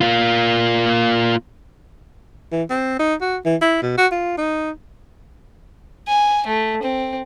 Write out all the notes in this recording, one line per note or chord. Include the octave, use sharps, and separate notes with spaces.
A#3 F4
E3
C4
D#4
F#4
E3
E4
B2
F#4
F4
D#4
G#5
A3
C4